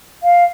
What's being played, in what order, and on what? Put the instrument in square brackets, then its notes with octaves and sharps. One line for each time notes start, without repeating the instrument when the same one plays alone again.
[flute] F5